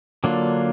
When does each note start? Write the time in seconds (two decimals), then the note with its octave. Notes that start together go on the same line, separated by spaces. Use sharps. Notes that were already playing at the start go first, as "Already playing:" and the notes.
0.24 D3 F#3 A#3 D4 F4